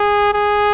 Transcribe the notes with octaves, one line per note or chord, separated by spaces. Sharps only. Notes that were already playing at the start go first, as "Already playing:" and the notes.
Already playing: G#4
G#4